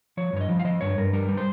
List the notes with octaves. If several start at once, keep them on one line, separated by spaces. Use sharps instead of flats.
F3 C#5
G2 C#5
D#5
F3
F5
F3 D#5
G2 C#5
G2 A#4
G3 A#4
G3
C5